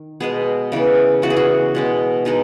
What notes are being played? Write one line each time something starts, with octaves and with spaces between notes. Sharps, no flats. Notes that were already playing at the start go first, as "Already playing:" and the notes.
Already playing: D#3
B2 G#3 B3 G#4
C#3 E3 B3
C#3 E3 B3 F#4
G#4
F#4
B2 G#3 B3
B2 G#3 D#4